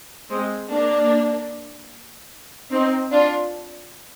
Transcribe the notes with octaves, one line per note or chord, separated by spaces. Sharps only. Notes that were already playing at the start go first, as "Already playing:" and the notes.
G#3 C4
A#3 D4
C4 D#4
D4 F4